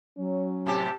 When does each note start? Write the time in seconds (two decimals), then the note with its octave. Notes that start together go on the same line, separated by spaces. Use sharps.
0.18 F#3 C#4
0.66 A2 C3 G4 A5